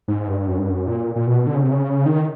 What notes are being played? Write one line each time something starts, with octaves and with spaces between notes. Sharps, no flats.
G#2
G2
F#2
G2
F#2
A#2
A#2
B2
D3
C#3
C3
C#3
D#3